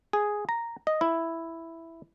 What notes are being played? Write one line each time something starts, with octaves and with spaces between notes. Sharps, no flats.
G#4
A#5
D#5
E4